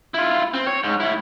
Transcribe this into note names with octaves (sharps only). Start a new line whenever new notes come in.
E4 F4
C4
C#5
G#2
A2 E4